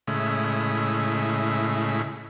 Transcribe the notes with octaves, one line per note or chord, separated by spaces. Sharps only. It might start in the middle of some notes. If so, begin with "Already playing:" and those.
A2 C#3 G#3 E4